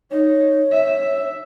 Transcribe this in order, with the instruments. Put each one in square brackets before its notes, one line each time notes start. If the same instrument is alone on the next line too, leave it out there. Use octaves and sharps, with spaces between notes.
[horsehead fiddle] D#4 [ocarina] C#5
[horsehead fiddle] E5